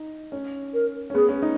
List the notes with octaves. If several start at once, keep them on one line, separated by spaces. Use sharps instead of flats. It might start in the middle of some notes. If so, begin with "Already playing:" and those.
Already playing: D#4
C#4
A#4
C#4
B3 G#4
C#4
D#4